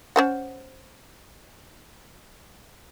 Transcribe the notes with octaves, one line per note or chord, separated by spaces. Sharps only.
C#4 C5 F#5